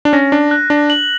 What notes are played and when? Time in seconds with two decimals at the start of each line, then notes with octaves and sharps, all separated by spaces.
0.05 D4
0.13 C#4 A#6
0.32 D4
0.51 F#6
0.70 D4
0.90 F#7